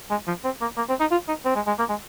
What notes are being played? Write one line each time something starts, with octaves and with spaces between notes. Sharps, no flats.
G#3
F3
C4
A#3
A#3
C4
D#4
F4
D#4
C4
G#3
G#3
A#3
G#3